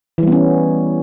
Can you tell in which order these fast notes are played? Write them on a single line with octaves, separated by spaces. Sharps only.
E3 G3 B3 C#4